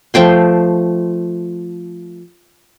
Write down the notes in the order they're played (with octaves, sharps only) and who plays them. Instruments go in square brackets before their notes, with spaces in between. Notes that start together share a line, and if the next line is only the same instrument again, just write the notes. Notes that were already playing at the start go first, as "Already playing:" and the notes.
[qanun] F3 A3 G5 C6